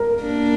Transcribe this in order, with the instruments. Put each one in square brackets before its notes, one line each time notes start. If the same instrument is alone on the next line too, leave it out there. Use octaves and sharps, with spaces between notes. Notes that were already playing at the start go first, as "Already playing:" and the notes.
Already playing: [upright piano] A#4
[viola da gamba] A#3 D4